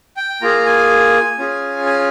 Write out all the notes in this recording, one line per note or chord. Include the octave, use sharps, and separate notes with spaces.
G5
A#3 F4 G#4 A#5
G#5
C#4 F4 G#4
G#5